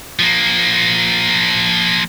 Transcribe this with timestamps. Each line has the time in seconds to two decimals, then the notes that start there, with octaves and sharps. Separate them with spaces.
0.19 F3 A#3